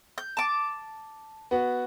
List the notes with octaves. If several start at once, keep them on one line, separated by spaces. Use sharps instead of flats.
G6
A5 D6
B3 F#4